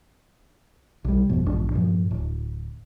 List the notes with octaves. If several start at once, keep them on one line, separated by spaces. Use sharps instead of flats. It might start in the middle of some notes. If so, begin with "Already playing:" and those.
B1 G3
G#1 F2 B2
A#1 E2 G#2 D4
G2 A#2 F3
D1